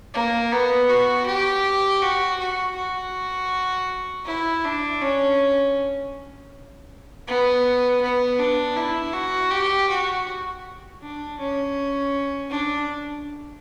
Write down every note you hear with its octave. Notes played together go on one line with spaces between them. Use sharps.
A#3
B3
F#4
G4
F#4
F#4
F#4
E4
D4
C#4
B3
B3
D4
E4
F#4
G4
F#4
D4
C#4
D4